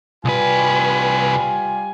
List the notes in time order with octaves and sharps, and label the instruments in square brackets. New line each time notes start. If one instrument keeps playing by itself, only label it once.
[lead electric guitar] C2 B4 [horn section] G3 F4 G#5